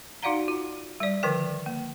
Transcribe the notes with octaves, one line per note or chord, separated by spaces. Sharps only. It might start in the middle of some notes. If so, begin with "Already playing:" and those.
D#4 F#4 D5 F5 F#5 A#5
F4
G3 D5
D3 D#3 F3 A#4 G5
A#3